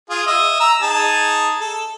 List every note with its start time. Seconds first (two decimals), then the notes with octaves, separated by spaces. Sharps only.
0.10 F4 G#4
0.27 D#5 E5
0.60 A#5 E6
0.82 D#4 G#4 A5
1.61 A4